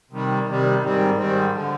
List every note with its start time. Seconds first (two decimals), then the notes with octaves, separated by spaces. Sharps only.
0.11 C3 D#3 G3
0.47 C3 D#3 G3
0.83 G#2 D#3 G3 C4
1.18 G#2 D#3 G3 C4
1.53 D3 F3